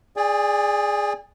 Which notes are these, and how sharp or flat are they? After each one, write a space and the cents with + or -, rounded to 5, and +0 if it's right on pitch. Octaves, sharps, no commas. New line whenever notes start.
G#4 +0 D5 +0 G#5 -45